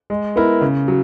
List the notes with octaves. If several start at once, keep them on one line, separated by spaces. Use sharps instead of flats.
G#3
B3 E4 A#4
C#3
F#3